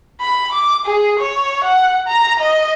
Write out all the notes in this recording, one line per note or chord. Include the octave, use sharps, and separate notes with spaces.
B5
D6
G#4
C#5
F#5
A#5
D#5